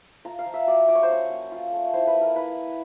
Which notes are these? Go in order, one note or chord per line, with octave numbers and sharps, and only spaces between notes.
F4 A#5
F5
F3
E5
F#3 D5
F4 D5
C#5
C5
C#4 C#5
A#3
F4
A3
E4 C5
B4
A#3
A#4
E4 B4
E4